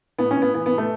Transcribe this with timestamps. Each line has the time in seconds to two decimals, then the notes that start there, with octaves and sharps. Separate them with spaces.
0.18 A2 B3
0.31 C#4
0.36 A2
0.42 B3
0.54 E3 B3
0.66 B3
0.72 A2
0.78 A3